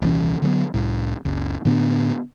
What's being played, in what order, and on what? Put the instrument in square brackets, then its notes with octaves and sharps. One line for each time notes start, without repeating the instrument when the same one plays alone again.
[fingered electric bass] D#1 C2 E3 C#4
D3 F#3 A3 B3
C2 A2
F#1 C#2
A2 D3 B3 D4